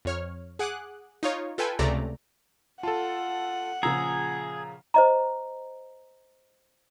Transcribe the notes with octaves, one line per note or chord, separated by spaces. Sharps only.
F2 C#5 F6
G#4 F#5 D6 D#6 F#6
D#4 F4 C#5
F4 A4 B4 G5 G#5
C#2 C3 A3 D5 A#5
F4 A4 F#5 A5
A#2 C#3 F3 G#4 A#5 E6
C5 D#5 A#5